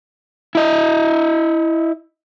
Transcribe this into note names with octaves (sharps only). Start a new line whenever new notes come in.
E4 D#5